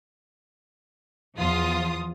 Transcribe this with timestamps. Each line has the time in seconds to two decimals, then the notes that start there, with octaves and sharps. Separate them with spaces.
1.37 E2 F3 F4 D#6